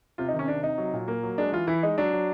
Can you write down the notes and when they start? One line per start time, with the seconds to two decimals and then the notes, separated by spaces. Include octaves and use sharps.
0.18 C3 F4
0.29 D#4
0.34 D#3 C#4
0.48 C3 D4
0.63 C3 D#4
0.78 F#3
0.93 A#2
1.08 A#3
1.23 F#3
1.38 G#3 D4
1.52 E3 F4
1.67 E3 E4
1.83 G#3 D#4
1.98 F#3 D4
2.13 F#3